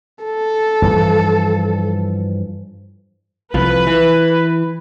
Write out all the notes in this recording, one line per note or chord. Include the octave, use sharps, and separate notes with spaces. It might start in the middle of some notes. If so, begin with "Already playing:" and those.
A4
G2 E3 F3
C2 F3 B4
E3